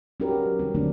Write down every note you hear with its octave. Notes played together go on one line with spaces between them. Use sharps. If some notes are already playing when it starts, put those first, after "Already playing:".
C#4 D#4 F#4 G4 A#4 B4
F#3
C3 D#3 G3 C4
D3 F3 F#3 A3 A#3 D4